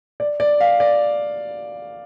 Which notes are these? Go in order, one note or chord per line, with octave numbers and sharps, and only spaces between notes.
D5
D5
F5
D5